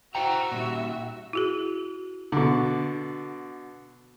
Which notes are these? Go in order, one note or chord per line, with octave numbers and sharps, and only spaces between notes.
F#4 C5 E5 F#5 G5 A#5
A#2 G3
E4 F#4 G#4
B2 D3